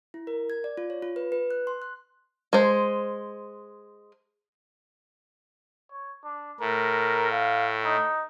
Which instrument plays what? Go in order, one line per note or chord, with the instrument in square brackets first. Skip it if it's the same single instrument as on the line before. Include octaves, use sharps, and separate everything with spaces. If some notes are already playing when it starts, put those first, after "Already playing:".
[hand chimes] E4
A#4
G#6
D5
F4
C#5
F4
B4
B4
F#6
C6
F#6
[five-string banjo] G#3 C5
[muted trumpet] C#5
D4
[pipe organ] A2 [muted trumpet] A#4
[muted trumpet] F5
D#4